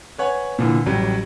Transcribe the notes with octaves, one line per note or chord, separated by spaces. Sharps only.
B4 C#5 F#5 G#5
A#2 D3 E3
A1 F#3 G3